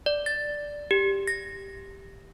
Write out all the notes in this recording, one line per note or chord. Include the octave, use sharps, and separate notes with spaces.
D5
A6
G4
A#6